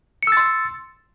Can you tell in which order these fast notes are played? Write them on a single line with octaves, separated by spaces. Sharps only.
C#7 E6 A6 C6